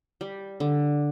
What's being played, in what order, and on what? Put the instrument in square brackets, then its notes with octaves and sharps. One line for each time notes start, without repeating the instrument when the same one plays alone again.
[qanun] G3
D3